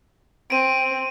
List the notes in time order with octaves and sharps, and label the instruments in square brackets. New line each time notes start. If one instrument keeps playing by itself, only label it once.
[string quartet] C4 [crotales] D7 D#7